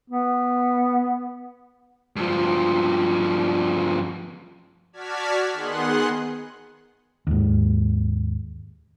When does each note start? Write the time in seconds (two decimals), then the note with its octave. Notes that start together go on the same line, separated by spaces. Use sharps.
0.10 B3
2.16 G2 F3
4.93 F#4 D5 A5 F6 G#6 B6
5.53 D#3 B3 G#4 F#5 C6 F#6
7.27 D#2 G#2